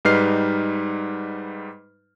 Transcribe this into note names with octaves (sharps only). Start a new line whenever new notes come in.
G#2 G3 D#4 B4 F6 C7